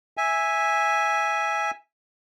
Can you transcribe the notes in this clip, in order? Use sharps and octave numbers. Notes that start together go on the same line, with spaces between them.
E5 G#5